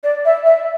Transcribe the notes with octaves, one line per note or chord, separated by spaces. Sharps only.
D5
E5
E5